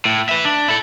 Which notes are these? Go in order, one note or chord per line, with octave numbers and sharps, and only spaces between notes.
A2
B4 E5
D4
E4 A4